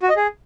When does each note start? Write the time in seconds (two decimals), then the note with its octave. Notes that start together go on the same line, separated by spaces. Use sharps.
0.03 F#4
0.09 D#5
0.16 G#4